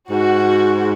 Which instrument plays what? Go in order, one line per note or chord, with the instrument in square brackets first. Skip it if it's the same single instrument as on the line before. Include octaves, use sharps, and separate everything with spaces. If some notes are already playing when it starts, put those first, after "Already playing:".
[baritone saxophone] G#2 [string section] F#4